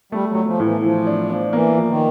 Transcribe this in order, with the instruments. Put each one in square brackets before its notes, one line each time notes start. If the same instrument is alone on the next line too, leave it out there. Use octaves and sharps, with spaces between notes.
[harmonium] G3 [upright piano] A3
[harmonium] F#3
[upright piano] A3
[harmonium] F3
[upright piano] A2 [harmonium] E3
[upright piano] E3 [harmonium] F3
[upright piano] D4
D4
[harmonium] E3 [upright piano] A#3
[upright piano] F3
[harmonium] D#3